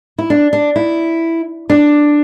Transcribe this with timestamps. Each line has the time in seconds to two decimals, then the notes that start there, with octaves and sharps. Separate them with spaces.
0.18 E4
0.30 D4
0.53 D4
0.76 E4
1.70 D4